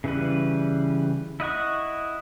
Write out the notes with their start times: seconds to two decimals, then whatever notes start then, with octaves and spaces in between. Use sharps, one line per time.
0.04 C#3 E3 G3 B4
1.40 E4 D#5 F#5 C#6